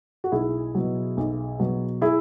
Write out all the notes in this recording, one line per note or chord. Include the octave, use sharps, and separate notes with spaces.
F#4
B1 E4 G#4
B2 F#3
B1
B2 F#3
E4 G#4